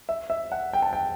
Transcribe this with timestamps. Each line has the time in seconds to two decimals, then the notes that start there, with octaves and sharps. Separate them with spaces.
0.09 E5
0.30 E5
0.52 F#5
0.73 G5
0.82 A5
0.93 G5